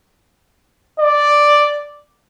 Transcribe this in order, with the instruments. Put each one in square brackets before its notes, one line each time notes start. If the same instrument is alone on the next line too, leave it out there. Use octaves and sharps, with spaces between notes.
[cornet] D5